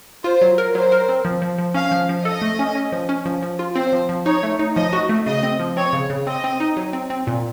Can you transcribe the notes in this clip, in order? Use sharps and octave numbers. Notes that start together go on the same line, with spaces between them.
F4 C5
F#3
A#4
F#3 C5
A#4
C4
F3
F3
F3
C#4 F5
F3
F3
A4 D#5
A3
C#4
C#4
F3
C#4
F3
F3
F4
C4 C5
F3
F3
D#4 C#5
A3
D#4
F3 D#5
F#4
A3
C#3 D#5
C4
F3
C4 C#5
C#3
C#3
C4 D#5
C4
D#4
F#3
C4
C4
A#2